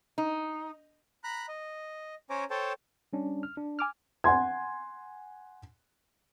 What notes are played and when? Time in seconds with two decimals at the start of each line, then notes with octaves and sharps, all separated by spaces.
0.18 D#4
1.24 A#5 B5 F#6
1.49 D#5
2.30 C#4 C5 C#5 G#5 A#5 D6
2.50 A4 C5 C#5 G5 A5
3.13 G3 C#4 D4
3.43 F6
3.57 D4
3.79 G#5 D6 F6
4.24 F#5 G#5 C6 G#6